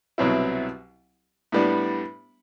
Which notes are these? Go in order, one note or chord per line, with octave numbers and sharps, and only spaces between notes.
C2 B2 F#3 C4 E4
A2 G3 B3 D4